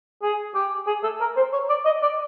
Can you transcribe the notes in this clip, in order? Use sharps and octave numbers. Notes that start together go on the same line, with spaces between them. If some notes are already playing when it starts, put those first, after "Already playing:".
G#4
G4
G#4
A4
A#4
C5
C#5
D5
D#5
D5